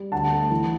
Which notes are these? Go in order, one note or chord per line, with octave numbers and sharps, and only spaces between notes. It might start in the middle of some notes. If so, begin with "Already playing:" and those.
Already playing: G3
D2 F#5 A5
A3
E3